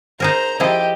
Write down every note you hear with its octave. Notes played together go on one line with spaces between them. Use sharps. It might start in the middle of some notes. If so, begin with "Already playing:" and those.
D#4 G#4 A#4 C5 A#5
F3 E4 G4 G#4 D#5